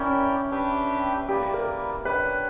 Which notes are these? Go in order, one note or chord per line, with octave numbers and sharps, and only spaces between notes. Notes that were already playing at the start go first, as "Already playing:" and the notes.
Already playing: C#4 E4 A#4 D5 G5
D4 G4 B4 E5 G5
A#3 E4 G4 B4 D5
A#4
D4 G4 B4 C#5 F#5